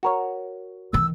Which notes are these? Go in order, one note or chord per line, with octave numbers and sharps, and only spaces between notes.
F#4 A#4 C#5
D#3 E3 E6